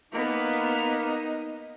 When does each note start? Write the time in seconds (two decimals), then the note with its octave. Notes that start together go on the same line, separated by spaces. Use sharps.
0.12 A#3 B3 D#4